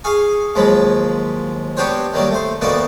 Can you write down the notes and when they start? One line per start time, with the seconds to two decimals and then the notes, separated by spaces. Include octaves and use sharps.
0.04 G#4 F5 G#5 C#6
0.55 D#2 F3 F#3 G#3 B5
1.77 B3 D4 F#4 G4 C5 C#5
2.14 D#3 F#3 G3 A#3 D4
2.31 A3 C5
2.61 D2 D#3 A#3 B3 F#4 D5